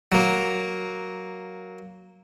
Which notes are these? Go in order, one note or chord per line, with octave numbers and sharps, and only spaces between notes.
F#3 A#3